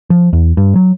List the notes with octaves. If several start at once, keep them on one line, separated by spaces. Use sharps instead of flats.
F3
E2
G2
F#3